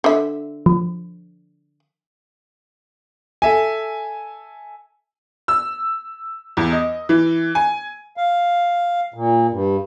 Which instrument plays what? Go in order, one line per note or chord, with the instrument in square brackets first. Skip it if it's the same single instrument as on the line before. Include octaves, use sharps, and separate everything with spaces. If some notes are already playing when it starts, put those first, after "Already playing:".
[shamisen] D3 E5
[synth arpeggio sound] F3
[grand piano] A4 E5 G#5
[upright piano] E6
E2
D#5
E3
G#5
[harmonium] F5
A#2
G2